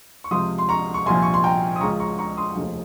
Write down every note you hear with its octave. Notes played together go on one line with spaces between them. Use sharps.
C#6
C#2 C3 F3 C6 D#6
C6
A#5 C#6
C#6
C2 A#2 F3 G#5 C6
C#6
C6
G5 A#5
D#6
C#2 C#3 F3 A#5 C#6
A#5 C#6
A#5 C#6
C6 D#6
F1 D#2 C#3 F3